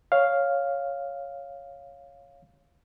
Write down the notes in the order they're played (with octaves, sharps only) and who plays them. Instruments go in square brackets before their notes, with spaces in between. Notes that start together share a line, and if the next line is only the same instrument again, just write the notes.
[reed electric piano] C#5 F5